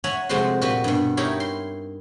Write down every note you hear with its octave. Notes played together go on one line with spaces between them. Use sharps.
C#5 E5 F#5 G#5 A#5
F2 C3 G#3 A3 F#4 C5
A#2 F#4 G4 B4
G2 B2
D#4 E4 G4 A#4 C#5
C6